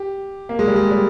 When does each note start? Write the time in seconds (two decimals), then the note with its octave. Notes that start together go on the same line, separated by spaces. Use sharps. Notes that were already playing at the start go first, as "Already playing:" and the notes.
Already playing: G4
0.49 A#3
0.59 G#3
0.67 G3
0.76 G#3
0.91 G3